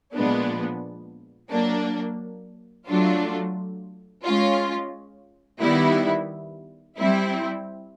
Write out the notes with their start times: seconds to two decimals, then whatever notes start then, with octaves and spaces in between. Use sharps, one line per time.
0.14 A#2 F3 G#3 B3 D4
1.50 F#3 A#3 D4
2.87 F#3 A3 D4 F4
4.24 G#3 C#4 F4
5.60 D#3 G3 B3 E4
6.97 G3 C4 E4